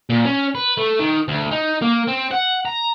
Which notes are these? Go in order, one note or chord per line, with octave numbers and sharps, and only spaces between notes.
A#2
C#4
B4
A3
D#3
D2
D#4
A#3
C4
F#5
A#5